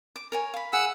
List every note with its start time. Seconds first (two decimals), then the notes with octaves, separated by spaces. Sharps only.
0.16 D6
0.32 A#4 C#5 G#5
0.54 F5 B5
0.73 G#4 F#5 E6